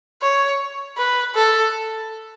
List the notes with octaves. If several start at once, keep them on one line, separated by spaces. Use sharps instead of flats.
C#5
B4
A4